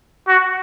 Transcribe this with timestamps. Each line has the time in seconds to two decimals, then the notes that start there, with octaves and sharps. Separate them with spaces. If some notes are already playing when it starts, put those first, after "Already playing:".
0.27 F#4